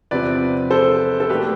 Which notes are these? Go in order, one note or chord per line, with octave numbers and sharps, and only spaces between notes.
E2 C3 F3 C4 B4 D5
A4 C5
A4
B2 A3 D4 G4 B4